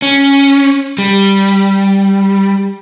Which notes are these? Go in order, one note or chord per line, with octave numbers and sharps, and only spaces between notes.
C#4
G3